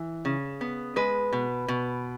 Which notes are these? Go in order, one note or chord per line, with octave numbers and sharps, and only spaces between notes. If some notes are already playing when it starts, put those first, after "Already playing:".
Already playing: E3
C#3
B3
G#3 B4
B2
B2